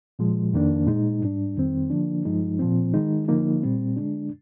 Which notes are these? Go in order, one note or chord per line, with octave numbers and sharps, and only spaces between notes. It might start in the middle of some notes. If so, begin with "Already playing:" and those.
A#2 F3 G#3
F2 D#3 A#3 D4
A#2 G#3 D#4
G#2 G3 D4
F2 D#3 G3 C4
D3 F3 A#3 D4
G2 F3 G#3 D#4
A#2 F3 C4
D#3 G#3 D#4
D3 F3 A#3 D#4
A#2 G3 C4
D3 G#3 D4